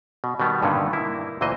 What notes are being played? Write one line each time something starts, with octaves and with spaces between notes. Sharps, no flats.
B2
B2 D#3 G3 B3
G2 A#2 D3 D#3 C#4 D#4
A#3 E4
D2 A#2 E3 C5 D#5